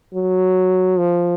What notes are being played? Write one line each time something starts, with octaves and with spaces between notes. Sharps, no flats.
F#3
F3